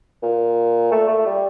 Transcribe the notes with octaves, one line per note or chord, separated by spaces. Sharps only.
A#2
A3
A3
G3